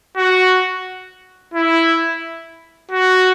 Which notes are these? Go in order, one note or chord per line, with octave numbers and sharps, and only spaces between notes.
F#4
E4
F#4